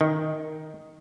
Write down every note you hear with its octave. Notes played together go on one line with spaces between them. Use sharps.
D#3